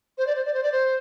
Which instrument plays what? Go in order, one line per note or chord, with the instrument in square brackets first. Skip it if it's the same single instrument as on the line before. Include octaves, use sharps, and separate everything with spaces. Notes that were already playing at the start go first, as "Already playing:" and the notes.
[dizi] C5
D5
C5
D5
C5
D5
C5